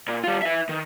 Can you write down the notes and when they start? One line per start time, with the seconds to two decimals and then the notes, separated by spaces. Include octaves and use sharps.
0.08 A#2
0.24 G3 F4
0.42 B4 E5
0.69 D#3